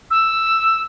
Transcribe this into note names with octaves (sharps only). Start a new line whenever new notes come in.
E6